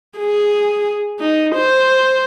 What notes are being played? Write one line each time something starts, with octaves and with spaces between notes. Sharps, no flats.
G#4
D#4
C5